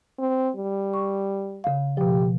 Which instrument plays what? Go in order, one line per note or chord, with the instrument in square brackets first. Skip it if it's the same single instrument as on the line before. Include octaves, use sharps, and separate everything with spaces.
[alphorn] C4
G3
[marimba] C#6
C#3 F5
[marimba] B2 F3 [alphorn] G4